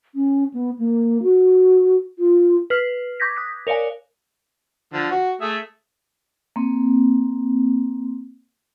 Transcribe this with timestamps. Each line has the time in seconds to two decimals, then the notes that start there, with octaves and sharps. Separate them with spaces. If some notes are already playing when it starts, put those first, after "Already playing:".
0.15 C#4
0.54 B3
0.79 A#3
1.23 F#4
2.19 F4
2.70 B4 F6 C7
3.20 C#6 D6 G6 G#6 A#6 B6
3.37 D#6 F#6 B6
3.67 A#4 C#5 D5 F5 G#5
4.93 D3 F3
5.11 F#4
5.41 A3 G#4 E5
6.56 A#3 C4